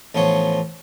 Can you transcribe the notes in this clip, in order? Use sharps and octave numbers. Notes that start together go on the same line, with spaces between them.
A1 F3 B3 C5 C#5